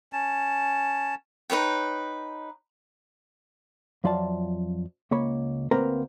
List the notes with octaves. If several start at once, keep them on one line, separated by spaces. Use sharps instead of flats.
C#4 A5
D#4 B4 C#5 G5
F2 F#3 F4 D5 E5 A5
C#2 A#3 C#5 B5
D2 A#3 C4 A#4 B4 A#5